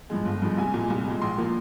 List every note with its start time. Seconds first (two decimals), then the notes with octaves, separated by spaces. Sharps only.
0.10 G2 F3 G#3
0.25 G1
0.42 G2 F3 G#3
0.58 C2 G#5
0.74 A#2 G#3
0.90 C2
1.06 A#2 G#3
1.21 A#1 C6
1.38 A#2 F3 A#3